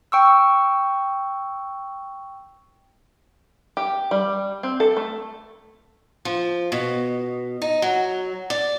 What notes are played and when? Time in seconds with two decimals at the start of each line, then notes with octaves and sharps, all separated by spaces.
0.12 G5 C#6 E6
3.77 G4
4.11 G3
4.63 C4
4.80 A4
4.96 A3
6.25 F3
6.72 B2
7.62 D#4
7.82 F#3
8.50 D5